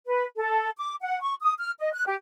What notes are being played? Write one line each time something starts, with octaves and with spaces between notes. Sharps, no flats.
B4
A4
D6
F#5
C#6
D#6
F6
D#5
F#6
G4